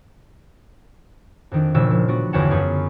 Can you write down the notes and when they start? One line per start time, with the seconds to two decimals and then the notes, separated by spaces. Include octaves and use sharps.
1.51 F2 D#3 D4
1.74 F#1 A#2 F3 A3 E6 E7
1.90 F3
2.08 B3 D4 F#4
2.33 G1 E2 F#4 C#5 F#5 A5
2.51 F#2 F4 G#4 B5